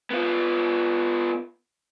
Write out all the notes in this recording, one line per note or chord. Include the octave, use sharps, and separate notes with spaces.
B3 F4